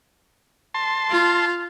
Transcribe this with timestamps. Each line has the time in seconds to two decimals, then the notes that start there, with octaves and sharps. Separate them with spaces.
0.74 A5 C6
1.11 F4